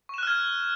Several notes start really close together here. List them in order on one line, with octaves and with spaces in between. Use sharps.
C#6 E7 F#6 F6 G#6